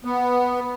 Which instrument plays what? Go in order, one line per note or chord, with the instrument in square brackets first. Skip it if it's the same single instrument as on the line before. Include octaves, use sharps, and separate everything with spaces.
[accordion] B3